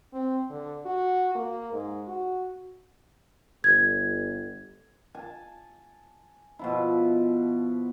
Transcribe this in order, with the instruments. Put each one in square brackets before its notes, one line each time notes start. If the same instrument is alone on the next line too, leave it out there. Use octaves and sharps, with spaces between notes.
[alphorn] C4
D3
F#4
A#3
G#2
F#4
[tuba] G1 [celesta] G#6
[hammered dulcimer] G#5 A5
B2 F3 E4